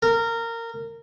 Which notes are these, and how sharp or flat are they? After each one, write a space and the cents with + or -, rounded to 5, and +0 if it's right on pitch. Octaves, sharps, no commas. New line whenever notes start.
A#4 -20